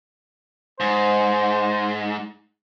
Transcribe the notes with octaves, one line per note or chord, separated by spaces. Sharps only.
G#2 C5